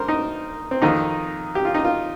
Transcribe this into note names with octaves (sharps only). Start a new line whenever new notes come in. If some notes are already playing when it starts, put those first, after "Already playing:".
Already playing: G2 A#4 C5
D#4
C4
F2 D#3 D#4
G4
F4
D#4
F4